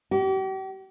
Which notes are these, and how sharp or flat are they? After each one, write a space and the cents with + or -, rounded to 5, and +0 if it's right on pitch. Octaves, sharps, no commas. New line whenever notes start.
G4 -40